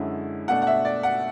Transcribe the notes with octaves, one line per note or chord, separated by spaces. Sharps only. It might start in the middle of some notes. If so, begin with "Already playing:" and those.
Already playing: F#2 D3 G#3 C#4 E4
B2 A3 D4 F#5
F#5
E5
D5
F#5